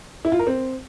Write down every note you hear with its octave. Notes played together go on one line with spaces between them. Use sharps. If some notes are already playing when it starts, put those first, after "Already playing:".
E4
F4
A#4
C4